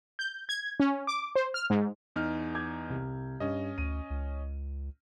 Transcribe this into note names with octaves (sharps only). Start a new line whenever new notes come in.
G6
G#6
C#4
D6
C5
F6
G#2
E2 D#4 F6
D6 G6 G#6
C2
G2 C#4 D#5
D2 D#7
C#2